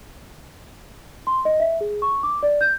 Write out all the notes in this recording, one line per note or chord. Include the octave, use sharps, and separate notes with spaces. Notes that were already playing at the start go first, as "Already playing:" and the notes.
C6
D#5
E5
G#4
C#6
D6
D5
G6